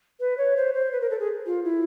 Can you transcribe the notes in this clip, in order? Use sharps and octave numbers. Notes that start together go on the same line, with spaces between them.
B4
C#5
C5
C5
B4
A#4
A4
G#4
F4
E4